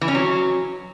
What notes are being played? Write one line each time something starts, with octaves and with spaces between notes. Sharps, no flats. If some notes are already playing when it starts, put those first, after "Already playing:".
E3
C#4
F#3